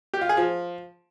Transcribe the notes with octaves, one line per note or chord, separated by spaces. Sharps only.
G4
F4
G#4
F3